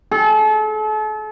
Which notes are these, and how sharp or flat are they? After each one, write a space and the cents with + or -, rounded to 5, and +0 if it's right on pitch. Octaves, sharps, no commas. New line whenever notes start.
A4 -40